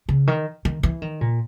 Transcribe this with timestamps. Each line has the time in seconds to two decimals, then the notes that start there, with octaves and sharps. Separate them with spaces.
0.09 C#3
0.27 D#3
0.65 D#3
0.83 E3
1.02 D#3
1.21 A#2